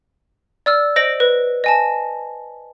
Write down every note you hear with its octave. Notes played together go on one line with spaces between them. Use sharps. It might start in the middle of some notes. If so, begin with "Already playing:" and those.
D5 E6 F6
C5 D#5 A#6 D7 F#7
B4
D#5 G#5 A5